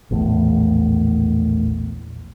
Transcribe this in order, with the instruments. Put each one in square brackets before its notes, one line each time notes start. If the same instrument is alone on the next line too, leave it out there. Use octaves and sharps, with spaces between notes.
[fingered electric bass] A#1 E2 A2